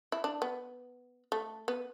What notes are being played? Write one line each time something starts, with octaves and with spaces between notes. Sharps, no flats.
E4
D4
B3
A3
B3